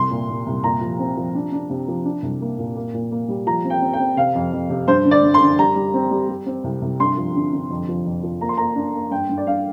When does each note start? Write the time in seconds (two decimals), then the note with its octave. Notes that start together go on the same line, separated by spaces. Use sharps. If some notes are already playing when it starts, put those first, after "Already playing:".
Already playing: C2 C6
0.11 A#2
0.29 A#2
0.46 C2
0.64 A#2 A#5
0.81 F3
0.99 C4
1.17 F3
1.35 D4
1.52 D4
1.70 C3
1.88 F3
2.05 D4
2.22 C2
2.41 A#3
2.58 A#2
2.76 A#3
2.94 A#2
3.11 A#3
3.28 G3
3.46 F3 A#5
3.65 C4
3.70 G5
3.82 C4
3.93 G5
3.99 C4
4.17 C3 F5
4.35 F2
4.52 F2
4.70 C3
4.87 G2 C5
5.05 D3
5.11 D5
5.23 G2
5.34 C6
5.41 D3
5.58 G3 A#5
5.75 G3
5.94 C4
6.11 G3
6.29 G3
6.46 C4
6.64 C2
6.81 C2
7.00 G2 C6
7.17 F3
7.35 D3
7.53 D3
7.71 F2
7.88 F3
8.05 F2
8.23 F3
8.41 A#3 A#5
8.49 C6
8.57 A#3 A#5
8.76 D4
8.94 A#3
9.11 G2 G5
9.29 G2
9.37 D5
9.46 G2 F5